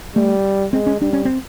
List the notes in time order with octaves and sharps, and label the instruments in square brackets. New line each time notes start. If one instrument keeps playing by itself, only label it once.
[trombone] G3 [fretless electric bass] A3
[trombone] G#3 [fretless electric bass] C4
[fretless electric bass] C#4
[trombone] G3 [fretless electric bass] D4
[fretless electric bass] C#4
C4